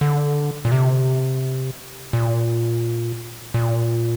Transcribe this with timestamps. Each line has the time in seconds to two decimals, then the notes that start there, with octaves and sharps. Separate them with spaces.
0.01 D3
0.65 A#2
0.72 C3
2.13 A#2
3.54 A#2